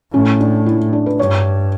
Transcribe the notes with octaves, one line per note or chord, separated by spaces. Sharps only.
A2 C#4
D4
E4
D4
B4
G2 C#5